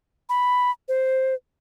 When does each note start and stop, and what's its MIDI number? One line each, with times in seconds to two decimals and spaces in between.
0.29 0.71 83
0.88 1.34 72